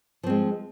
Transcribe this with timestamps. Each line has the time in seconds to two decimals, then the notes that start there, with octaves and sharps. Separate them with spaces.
0.23 F3
0.26 C4
0.30 G#3